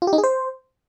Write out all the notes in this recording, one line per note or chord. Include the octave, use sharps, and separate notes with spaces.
F4
G4
D#4
G#4
C5